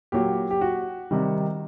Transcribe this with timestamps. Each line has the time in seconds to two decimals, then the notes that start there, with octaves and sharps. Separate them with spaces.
0.12 A#2 F#3 G4
0.51 G4
0.61 F#4
1.11 C3 D#3 G3